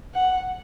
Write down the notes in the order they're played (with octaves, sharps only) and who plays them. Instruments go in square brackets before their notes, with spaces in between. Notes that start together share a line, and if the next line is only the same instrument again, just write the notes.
[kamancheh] F#5